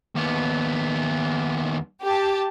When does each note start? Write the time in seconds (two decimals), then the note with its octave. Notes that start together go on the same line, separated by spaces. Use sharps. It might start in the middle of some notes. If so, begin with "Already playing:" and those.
0.15 D#2 B3
2.01 G4 A5